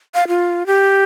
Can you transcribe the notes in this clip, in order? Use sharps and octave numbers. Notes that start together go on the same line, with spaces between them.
F5
F4
G4